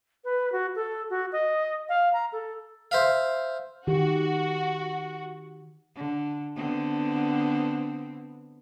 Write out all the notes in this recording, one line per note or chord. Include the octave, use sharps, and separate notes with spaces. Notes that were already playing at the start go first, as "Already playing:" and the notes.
B4
F#4
A4
F#4
D#5
F5
A#5
A4
C5 E5 F5
D#3 F#4 G4
D3
D3 B3 C4